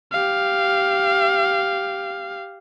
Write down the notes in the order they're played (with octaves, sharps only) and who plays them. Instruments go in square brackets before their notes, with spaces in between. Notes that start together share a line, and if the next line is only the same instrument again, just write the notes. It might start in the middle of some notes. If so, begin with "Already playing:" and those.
[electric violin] G4 F5